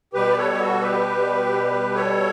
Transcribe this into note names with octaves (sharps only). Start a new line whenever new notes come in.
B2 G3 G4 B4
D5
A4 C#5
G4
F#4 A4
G4 B4
A4 C#5